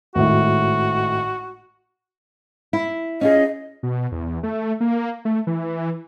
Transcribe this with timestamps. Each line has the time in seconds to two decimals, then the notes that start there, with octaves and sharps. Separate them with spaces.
0.15 G#1 A2 F#4
2.73 E4
3.21 C#4 F4 G#4 D#5
3.83 B2
4.12 E2
4.43 A3
4.80 A#3
5.25 A3
5.47 E3